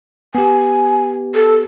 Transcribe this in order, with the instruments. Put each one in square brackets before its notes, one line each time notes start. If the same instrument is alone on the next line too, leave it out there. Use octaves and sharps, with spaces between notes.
[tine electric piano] B3 G4 [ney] G#5
[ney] A4